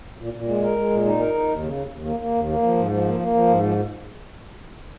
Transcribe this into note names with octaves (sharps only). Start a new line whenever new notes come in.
A#2
A#2
G#3
A#4
G#3
A#2
D#4
A#4
D#4
D#2
C#3
D#2
D#2
A#3
A#3
D#2
A#3
F3
G#2
F3
A#3
A#3
F3
G#2
F3